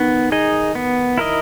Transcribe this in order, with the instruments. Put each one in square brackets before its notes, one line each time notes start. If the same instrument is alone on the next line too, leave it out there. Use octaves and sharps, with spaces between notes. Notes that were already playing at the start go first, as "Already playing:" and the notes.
Already playing: [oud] D#3 [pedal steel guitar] B3
[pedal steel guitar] D#4 G#4 D#5
B3
E4 A#4 D#5